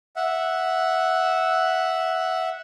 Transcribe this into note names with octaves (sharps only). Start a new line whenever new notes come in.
E5 F#5